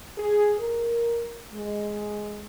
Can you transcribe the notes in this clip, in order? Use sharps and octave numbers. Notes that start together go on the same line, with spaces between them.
G#4
A#4
G#3